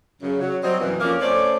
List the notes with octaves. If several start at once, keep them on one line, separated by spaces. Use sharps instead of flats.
F#2 C#3
F#3
F#3 G3 C4 C5 D#5
F#2 B2 E3
F2 A#3 C#4 A#4 D5
A3 C#4 C5 D5